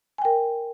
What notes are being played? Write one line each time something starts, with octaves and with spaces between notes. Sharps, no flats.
A#4 G5 G#5